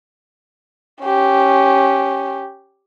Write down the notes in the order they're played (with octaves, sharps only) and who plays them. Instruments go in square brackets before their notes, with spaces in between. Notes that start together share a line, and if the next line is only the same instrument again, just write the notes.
[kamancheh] C#4 G4